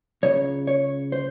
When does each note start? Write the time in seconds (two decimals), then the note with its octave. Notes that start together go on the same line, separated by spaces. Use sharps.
0.23 C#2 C#3 C#5
0.67 C#5
1.12 C5